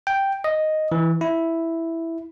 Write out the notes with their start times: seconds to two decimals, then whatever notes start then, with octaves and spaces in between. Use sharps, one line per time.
0.07 G5
0.44 D#5
0.92 E3
1.21 E4